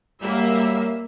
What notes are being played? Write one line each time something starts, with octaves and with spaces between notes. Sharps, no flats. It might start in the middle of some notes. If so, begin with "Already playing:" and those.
F#2 G3 A#3 E5